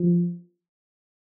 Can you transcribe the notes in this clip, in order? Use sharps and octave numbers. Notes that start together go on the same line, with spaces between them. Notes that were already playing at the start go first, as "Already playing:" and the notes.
Already playing: F3